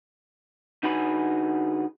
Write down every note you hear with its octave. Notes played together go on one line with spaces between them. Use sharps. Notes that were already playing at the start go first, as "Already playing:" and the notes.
D3 D#4 F#4 G#4 B4 B5